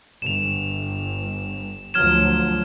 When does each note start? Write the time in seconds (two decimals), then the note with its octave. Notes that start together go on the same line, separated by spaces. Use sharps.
0.22 G1 E7 F7
1.94 D2 F3 F#3 F6 G#6 E7